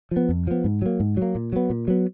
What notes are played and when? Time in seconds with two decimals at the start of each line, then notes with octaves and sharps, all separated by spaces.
0.11 F3
0.16 B3
0.29 F2
0.47 F3 B3
0.64 G#2
0.82 F#3 A#3
1.00 G#2
1.17 F#3
1.22 A#3
1.35 A#2
1.53 F#3 B3
1.70 A#2
1.88 F#3 B3